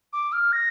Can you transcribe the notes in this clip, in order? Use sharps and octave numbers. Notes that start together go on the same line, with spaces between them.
D6
F6
A#6